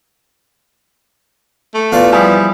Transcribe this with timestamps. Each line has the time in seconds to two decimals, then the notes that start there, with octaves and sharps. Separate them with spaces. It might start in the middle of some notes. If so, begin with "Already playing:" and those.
1.74 A3
1.92 E2 F4 D5
2.12 F3 G3 E4 G#4